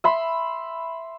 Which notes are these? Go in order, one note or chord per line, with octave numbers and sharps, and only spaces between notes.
E5 B5 C6